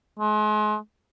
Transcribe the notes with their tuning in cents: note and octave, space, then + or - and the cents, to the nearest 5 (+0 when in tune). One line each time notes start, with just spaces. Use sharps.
G#3 +35